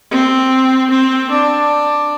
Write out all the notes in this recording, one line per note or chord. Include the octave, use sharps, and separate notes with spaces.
C4
C4
D4